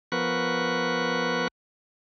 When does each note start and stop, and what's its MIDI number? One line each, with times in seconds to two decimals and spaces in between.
0.12 1.48 53
0.12 1.48 59
0.12 1.48 70
0.12 1.48 71
0.12 1.48 85
0.12 1.48 90